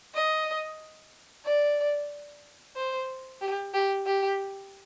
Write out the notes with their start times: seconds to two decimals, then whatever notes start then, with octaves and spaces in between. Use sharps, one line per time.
0.15 D#5
1.45 D5
2.76 C5
3.41 G4
3.74 G4
4.06 G4